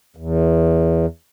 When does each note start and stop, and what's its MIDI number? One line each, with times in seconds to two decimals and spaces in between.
0.17 1.06 40